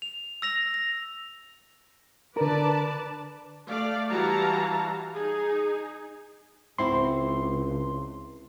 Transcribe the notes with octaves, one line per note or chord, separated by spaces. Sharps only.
F7
E6 A#6 F7
A#6
D3 A#4 B4 D5 A5
A3 D5 F5
E3 G3 F#4 F5 A5 A#5
D#4 G#4
C#2 C4 E4 F#4 C6